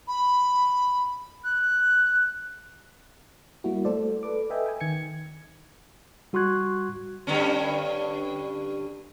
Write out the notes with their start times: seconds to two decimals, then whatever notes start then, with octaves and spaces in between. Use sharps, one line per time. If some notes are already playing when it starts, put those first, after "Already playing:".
0.07 B5
1.44 F#6
3.64 G3 A#3 E4 F#4
3.85 A3 A4 C5 D5
4.23 A4 B4 D5 D6
4.50 A4 B4 D#5 E5 G5 G#5
4.66 G5 G#5
4.80 D#3 G#6 C#7
6.33 G3 F#4 C6 C#6 F#6 G#6
7.27 G2 D3 C#4